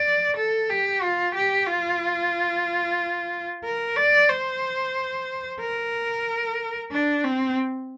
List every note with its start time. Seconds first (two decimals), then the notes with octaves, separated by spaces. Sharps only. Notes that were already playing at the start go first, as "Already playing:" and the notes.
Already playing: D5
0.37 A4
0.69 G4
1.02 F4
1.35 G4
1.67 F4
3.65 A#4
3.97 D5
4.29 C5
5.60 A#4
6.91 D4
7.24 C4